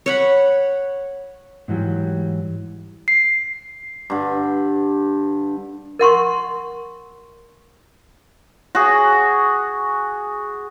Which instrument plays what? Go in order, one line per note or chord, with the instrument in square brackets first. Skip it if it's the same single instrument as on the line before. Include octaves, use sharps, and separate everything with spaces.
[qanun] C#5 F#5 B5
[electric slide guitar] G#2 E3 F#3 G3
[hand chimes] C7
[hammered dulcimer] G2 D3
[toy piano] A#4 F#5 C6 C#6
[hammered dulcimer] F#4 G#4